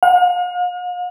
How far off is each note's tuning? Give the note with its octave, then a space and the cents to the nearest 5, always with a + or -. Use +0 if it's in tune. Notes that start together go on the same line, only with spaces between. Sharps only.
F5 +45